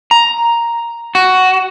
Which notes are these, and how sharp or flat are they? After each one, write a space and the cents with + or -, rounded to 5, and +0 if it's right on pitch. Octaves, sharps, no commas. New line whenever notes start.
A#5 +5
F#4 +10